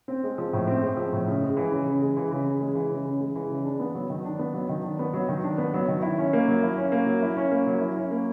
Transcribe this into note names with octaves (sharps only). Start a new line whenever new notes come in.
C4
G#3
F3
A2
C4
G#3
F3
A2
C#3
G#3
E3
C#3
C#3
G#3
E3
C#3
C#3
G#3
E3
C#3
C#3
G#3
E3
C#3
D4
B3
F#3
D#3
D4
B3
F#3
D#3
D4
B3
F#3
D#3
D4
B3
F#3
D#3
E4
C#4
A#3
F#3
E4
C#4
A#3
F#3
E4
C#4
A#3
F#3
E4
C#4
A#3